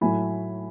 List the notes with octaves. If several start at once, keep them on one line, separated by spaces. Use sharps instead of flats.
A2 F#3 A3 G#5 B5